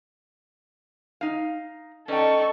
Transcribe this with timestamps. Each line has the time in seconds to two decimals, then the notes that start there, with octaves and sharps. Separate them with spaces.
1.21 D#4 F5
2.08 C#4 D#4 A4 D5 G5 C#6